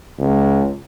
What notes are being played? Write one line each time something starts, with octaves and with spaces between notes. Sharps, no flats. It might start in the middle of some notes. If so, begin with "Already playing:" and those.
C#2